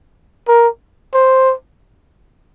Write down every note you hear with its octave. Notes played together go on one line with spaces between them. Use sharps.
A#4
C5